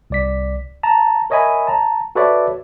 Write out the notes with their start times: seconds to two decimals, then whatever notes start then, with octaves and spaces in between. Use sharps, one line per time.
0.10 C2 D5 B6
0.83 A5 A#5
1.30 A#4 C#5 D#5 E5 G#5 B5
1.67 A5 A#5
2.15 F#4 A4 B4 C#5 D5 E5